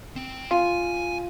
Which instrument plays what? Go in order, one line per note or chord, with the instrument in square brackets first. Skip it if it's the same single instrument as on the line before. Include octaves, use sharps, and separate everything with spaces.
[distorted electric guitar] C4
[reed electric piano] F4 F5 [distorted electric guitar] G#5